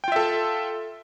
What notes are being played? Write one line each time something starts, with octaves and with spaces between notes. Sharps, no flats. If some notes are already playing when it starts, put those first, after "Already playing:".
F4 A4 E5 G5